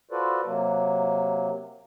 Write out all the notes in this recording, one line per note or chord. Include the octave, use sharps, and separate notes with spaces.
F4 F#4 A4 B4 C5 D5
C3 F#3 A#3